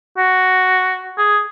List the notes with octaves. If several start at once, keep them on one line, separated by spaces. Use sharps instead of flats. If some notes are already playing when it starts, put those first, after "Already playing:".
F#4
G#4